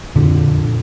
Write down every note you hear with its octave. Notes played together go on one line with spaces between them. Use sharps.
F2 A#2 D3